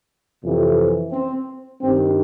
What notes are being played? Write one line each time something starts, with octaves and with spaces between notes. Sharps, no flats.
F2 C3 E3
C4
G2 D#3 C4